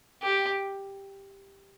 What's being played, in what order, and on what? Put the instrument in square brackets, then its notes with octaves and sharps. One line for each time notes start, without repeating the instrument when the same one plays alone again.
[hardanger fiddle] G4